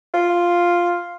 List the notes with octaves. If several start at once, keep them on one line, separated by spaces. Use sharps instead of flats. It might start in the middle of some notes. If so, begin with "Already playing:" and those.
F4